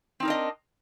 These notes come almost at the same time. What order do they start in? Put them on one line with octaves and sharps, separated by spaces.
C4 D#4 A#4 D4 D#5